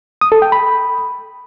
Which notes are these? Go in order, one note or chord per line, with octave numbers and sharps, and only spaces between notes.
D#6
A4
G5
B5